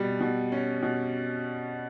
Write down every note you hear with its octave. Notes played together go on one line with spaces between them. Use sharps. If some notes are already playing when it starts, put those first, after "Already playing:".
Already playing: B2 G3
B2
C#4
B2